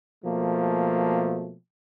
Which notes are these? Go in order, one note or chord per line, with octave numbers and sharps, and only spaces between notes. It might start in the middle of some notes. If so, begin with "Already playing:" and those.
B2 F3 A3 A#3